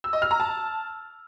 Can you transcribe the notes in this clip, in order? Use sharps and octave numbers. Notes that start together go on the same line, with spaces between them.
E6
D#5
F6
A#5
A5